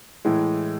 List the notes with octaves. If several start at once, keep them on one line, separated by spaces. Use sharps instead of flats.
A2 E3 G#3 E4